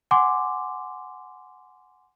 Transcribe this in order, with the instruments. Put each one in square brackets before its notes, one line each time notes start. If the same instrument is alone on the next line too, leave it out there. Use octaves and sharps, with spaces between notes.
[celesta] F#5 G#5 C6 D6